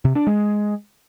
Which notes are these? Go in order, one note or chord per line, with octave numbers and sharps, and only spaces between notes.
C3
D4
G#3